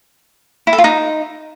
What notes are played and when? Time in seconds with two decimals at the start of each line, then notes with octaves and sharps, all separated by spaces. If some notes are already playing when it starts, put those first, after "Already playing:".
0.67 E4
0.73 A4
0.78 F4
0.84 D#4